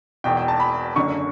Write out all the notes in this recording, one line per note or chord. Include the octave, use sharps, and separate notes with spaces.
E1 E2 B2 G5
G5
A5
B5
F#1 F#2 D3 C#6